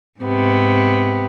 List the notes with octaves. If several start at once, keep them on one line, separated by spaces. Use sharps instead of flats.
G#2 C3 B3